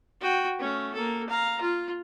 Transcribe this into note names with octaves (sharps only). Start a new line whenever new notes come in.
F#4 G5
A3 C#4
A#3 A4
F5 A#5
F4